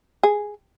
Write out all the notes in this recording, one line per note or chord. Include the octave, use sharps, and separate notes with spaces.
G#4